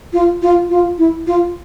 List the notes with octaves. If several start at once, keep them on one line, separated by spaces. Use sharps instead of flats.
F4
F4
F4
E4
F4